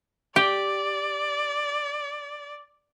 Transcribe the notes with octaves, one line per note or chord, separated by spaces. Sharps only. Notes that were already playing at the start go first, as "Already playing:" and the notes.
G4 D5